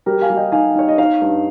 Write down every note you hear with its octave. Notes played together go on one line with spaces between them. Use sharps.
G3 G4 A#4
F5 G#5
G3
D#5 G5
D#4 F5 G#5
D#4 C#5
D#5
D#4 C#5 F5
G2